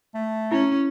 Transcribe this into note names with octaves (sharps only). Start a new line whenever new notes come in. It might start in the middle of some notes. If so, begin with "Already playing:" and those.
A3
C#4 E4